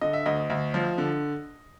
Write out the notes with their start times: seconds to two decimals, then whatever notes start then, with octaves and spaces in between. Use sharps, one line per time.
0.01 D3 D#5
0.13 E5
0.26 D2 D#5
0.50 D2
0.74 F3
0.98 D3